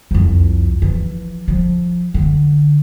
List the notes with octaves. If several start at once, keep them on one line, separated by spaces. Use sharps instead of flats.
C2 F2
E3 F3
F3
D3